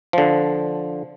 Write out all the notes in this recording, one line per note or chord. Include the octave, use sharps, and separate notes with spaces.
D3 F3